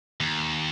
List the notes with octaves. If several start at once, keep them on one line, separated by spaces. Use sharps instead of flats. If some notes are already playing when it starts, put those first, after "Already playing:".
D#2